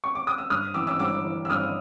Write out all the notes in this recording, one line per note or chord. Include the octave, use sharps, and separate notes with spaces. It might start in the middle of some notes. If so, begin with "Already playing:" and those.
C#6
D6
D#6
E6
G2 D#6 F6
E3 D6 E6
D6 E6
G2 D6 E6
E3
E6
G2 D#6 F6